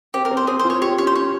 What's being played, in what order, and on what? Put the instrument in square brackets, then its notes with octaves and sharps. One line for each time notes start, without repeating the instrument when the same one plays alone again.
[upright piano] C4 [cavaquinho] G4
[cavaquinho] A#4
[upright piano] C4
[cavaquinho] C5
[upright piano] C4 [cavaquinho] G#4
[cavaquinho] C5
[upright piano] F4
[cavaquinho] C#5
[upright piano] G4 [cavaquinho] C#5
[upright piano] C#4 [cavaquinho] C#5
[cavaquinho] C5
[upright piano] C#4 [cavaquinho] C#5